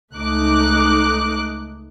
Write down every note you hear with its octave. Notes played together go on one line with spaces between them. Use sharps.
C#2 A3 D#4 D6 F#6